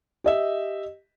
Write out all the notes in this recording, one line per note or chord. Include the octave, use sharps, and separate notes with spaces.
G4 D#5 E5